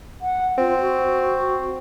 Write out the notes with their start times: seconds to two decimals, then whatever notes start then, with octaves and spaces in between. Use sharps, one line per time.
0.21 F#5
0.58 C4 F4
0.80 F#4